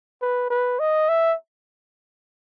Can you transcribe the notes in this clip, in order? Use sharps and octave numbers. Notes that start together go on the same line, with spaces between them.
B4
B4
D#5
E5